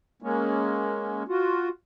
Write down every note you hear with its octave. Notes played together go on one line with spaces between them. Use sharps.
G#3 A#3 C#4
F4 F#4